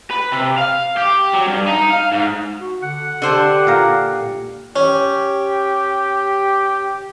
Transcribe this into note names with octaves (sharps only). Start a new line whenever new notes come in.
B4
C3
F5
G4
F#3
G2
D#4
F5
G#2
F#4
D3 F#5
D3 G4 C5 A5
A#2 F5 A#5
C#4 G4